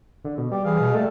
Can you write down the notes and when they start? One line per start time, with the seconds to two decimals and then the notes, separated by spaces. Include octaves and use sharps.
0.25 D3
0.38 B2
0.51 G3 G4
0.65 E3 G#4 F5
0.79 B2
0.94 G3 A3 A4